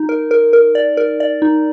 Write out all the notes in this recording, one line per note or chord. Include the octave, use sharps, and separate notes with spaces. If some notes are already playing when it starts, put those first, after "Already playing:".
Already playing: D#4
A#4
A#4
A#4
D5
A#4
D5
D#4